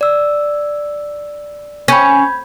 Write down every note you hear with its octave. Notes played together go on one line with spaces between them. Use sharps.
D5 E6
C#4 B5 G6 G#6